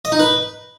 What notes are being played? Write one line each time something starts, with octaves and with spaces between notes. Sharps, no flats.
D#5
D#4
B4